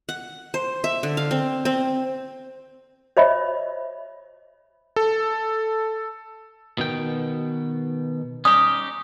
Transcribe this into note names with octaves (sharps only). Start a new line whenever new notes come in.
F#5
C5
E5
D3
F5
C4
C4
C5 C#5 D#5 E5 B5
A4
B2 D#3 G5
C#4 D#4 G4 D#6